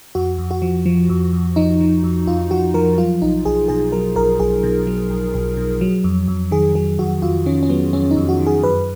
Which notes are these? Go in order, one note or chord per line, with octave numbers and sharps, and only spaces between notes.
F2 F#4
F2
F#4
F3
F3
F2
F2
F3 D#4
F3
F2
F2 F4
F3 F#4
F3 A#4
F#3 F4
B1 D#4
B1 G#4
B2 G#4
F#3 A#4
B1 A#4
B1 G#4
B2
F#3
B1
B1
B2
F#3
F2
F2
D#3 G#4
F#3 G#4
F2 F#4
F2 F4
D#3 C#4
C#4
F#3 B3
F2 C#4
D#4
F2
F#4
D#3
G#4
F#2 B4